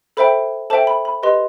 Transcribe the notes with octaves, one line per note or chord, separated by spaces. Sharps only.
A4 C5 E5 G5 B5
A4 C5 E5 G5 A5
B5
B5
G4 B4 D#5 C6